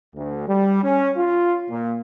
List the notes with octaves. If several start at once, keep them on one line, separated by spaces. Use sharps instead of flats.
D2
G3
C#4
F4
A#2